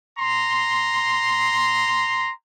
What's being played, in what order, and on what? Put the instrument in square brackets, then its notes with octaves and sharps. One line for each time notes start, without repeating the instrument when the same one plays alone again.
[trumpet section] A#5 C6